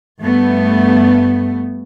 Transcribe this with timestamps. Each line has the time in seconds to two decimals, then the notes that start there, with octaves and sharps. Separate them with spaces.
0.21 G2 A3 B3